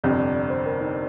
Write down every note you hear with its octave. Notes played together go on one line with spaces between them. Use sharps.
G1 F2 C3 D5
D5
D5
C5
A#4
D#4